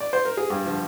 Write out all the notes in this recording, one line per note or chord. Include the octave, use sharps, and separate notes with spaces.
D5
C5
A#4
G#4
G2 G4
D3 F3